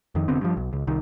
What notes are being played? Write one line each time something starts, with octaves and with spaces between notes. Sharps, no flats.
F2 D#3
F1 D3 B3 C4
G2 F3
B1
C#2
C2 D#3